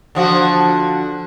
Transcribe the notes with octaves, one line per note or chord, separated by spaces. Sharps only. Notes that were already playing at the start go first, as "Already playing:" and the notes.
D3 F3 F#4